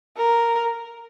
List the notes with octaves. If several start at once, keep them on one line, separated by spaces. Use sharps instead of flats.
A#4